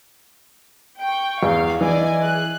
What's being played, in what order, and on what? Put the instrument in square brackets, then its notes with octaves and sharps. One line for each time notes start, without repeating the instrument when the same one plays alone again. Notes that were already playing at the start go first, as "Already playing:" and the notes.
[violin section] G5 C#6
[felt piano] E2 [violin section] F5
[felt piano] E3 [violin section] D5 D#5 G#5
[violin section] G#4 F#6